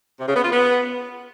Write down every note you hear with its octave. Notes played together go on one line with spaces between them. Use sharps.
C3
C#3
B3
F4
B3